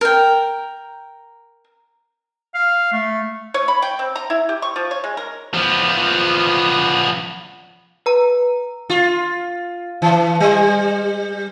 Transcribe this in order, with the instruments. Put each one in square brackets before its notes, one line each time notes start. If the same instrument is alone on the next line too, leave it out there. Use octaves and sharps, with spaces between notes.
[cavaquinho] A#4 G5
[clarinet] F5
A3
[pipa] C#5
B5
G5
C4
A#5
E4
G4
C#6
F3
C#5
G#3
A#4
[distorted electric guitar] F3 B3
[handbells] B4 A#5
[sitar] F4
E3
G3